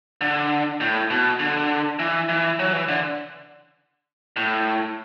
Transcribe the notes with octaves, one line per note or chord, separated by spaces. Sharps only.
D3
A2
B2
D3
E3
E3
F#3
E3
D3
A2